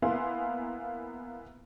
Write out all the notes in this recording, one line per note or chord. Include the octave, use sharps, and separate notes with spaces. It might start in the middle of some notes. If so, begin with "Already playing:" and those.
A#3 B3 E4 F5 G#5 C6